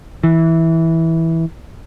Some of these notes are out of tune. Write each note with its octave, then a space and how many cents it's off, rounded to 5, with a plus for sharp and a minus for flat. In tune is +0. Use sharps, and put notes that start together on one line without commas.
E3 -10